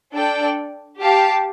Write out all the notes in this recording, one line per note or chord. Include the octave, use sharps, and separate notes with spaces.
D4 A4 D5 G5
G4 F5 A5